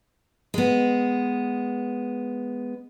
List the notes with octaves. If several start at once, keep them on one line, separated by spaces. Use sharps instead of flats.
G#3 B3